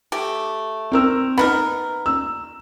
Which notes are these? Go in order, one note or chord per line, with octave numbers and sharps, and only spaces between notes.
A3 G4
C4 A#4 E6
B3 D#4 A#4 B5
E6